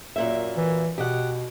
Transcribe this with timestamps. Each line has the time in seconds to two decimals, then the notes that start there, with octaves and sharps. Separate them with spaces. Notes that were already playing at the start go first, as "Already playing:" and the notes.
0.16 F#2 A#2 E5
0.57 E3
0.98 B2 G4 D#5 F#5